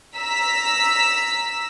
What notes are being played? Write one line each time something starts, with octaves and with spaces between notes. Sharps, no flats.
A#5 E6 B6